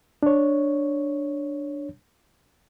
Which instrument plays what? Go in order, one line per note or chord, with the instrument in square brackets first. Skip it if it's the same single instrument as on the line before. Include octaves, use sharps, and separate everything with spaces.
[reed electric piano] D4 C#5